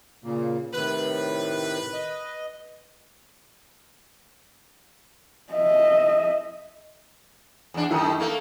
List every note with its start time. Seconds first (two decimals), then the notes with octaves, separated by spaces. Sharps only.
0.24 A#2 C#3 A#3
0.74 A2 C3 D#3 B4
1.93 D#5
5.53 D#5 E5
7.74 E2 D4
7.91 F#2 D#3 A3 E4 D#6
8.20 A3 A#3